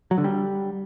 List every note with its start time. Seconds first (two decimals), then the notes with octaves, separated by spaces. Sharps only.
0.11 F#3
0.18 D3
0.24 G3